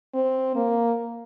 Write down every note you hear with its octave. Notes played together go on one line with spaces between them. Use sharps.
C4
A#3